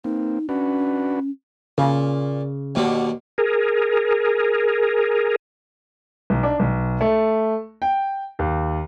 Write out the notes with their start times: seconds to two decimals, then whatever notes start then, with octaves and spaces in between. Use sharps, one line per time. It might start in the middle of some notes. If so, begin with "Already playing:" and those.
0.04 A#3 C4 D#4
0.49 C#4 D4 F#4 B4
1.78 A#2 C#3
2.75 D#2 B2 D3
3.38 G#4 A#4
6.30 B1
6.43 D4
6.60 B1
7.01 A3
7.82 G5
8.39 D#2